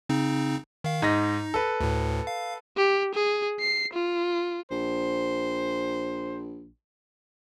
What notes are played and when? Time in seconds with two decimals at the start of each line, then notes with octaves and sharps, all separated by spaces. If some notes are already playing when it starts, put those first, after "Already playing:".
0.09 C#3 C4 D#4
0.84 D#3 F5
1.02 G#2 D#4 D#5 A#6
1.54 A4 B4
1.80 D2 A2
2.27 F5
2.77 G4
3.15 G#4
3.60 C7
3.94 F4
4.71 A#1 C5